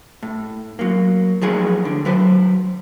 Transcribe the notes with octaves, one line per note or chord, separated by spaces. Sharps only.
A2
F#3 A#3
A2 F3 F#3 G#4 G#5
D3
F#3 B4 C5